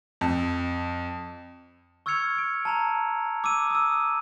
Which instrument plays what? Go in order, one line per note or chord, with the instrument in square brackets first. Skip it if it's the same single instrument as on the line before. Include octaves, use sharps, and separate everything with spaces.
[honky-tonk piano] F2
[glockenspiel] C#6 E6 F6 G#6 C#7 F7
D7
A5 A#5 F7
D6 E6 D#7
D#6 E6